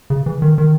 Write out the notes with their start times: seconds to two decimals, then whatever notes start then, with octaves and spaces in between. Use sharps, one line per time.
0.10 C#3
0.26 E3
0.42 D#3
0.58 D#3